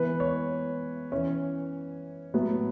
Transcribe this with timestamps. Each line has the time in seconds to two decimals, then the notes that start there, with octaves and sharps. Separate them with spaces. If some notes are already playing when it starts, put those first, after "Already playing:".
Already playing: E3 B3 B4
0.20 C#5
1.12 E3 C#4
2.34 A2 F#3 B3